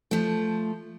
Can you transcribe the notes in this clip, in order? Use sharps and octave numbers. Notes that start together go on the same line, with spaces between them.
F3 A3